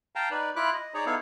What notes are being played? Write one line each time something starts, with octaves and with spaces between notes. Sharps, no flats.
F5 G5 A5 A#5
D#4 B4 D5
E4 F4 B5 D6 F#6
D#5
D#4 G#4 C#5 D5 A#5
B3 D#4 E4 A4 C#5 F5